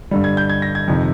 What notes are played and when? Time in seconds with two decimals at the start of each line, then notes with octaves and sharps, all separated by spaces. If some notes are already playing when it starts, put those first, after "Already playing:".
0.11 G2 D3 G3
0.24 G#6
0.37 G6
0.49 G#6
0.62 A#6
0.75 G#6
0.88 F2 C3 D#3